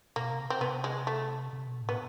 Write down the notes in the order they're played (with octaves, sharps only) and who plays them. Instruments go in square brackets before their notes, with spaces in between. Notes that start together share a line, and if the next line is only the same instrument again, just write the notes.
[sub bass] B2 [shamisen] A#3
[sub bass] C3
[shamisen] C4
[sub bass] C3 [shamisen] B3
[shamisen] G#3
A3
[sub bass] C3
B2
A2
[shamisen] B3